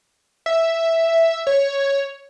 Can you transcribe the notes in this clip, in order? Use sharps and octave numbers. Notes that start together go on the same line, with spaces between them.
E5
C#5